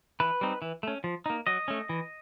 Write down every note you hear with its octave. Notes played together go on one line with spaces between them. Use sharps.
E3 B4
G3 C4 D#4
E3
A3 C#4
F3
A#3 D#4
F#3 D#5
A3 C#4
E3